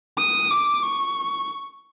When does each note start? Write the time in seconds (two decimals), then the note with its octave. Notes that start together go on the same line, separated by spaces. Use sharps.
0.18 D#6
0.50 D6
0.83 C#6